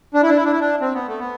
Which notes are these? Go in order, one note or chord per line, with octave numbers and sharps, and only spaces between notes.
D4
E4
D4
E4
D4
E4
D4
C4
B3
A3
B3